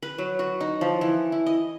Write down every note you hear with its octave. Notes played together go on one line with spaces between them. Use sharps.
B4
F#3
F#4
D#4
F3
E3
E4
D#5